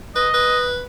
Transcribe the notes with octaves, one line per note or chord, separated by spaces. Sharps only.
B4 D#5
B4